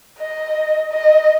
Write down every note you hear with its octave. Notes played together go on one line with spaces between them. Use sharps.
D#5
D#5